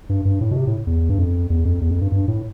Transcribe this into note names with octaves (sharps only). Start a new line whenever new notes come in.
G2
G2
A2
B2
C3
A2
E2
G2
F2
E2
F2
E2
F2
G2
G2
A2